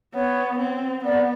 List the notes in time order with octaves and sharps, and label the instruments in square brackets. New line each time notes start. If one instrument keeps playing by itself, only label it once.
[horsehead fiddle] B3 [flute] C#5
[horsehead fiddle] C4
[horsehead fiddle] B3 [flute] D5